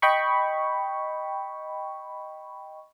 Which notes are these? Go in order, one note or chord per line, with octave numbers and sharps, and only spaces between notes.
D#5 G5 B5 C#6